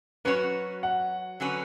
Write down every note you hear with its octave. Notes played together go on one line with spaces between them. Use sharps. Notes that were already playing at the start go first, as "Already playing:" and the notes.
F#3 C#4 F#4 B4 C#5
F#5
D3 F#3 C#4 F#4 B4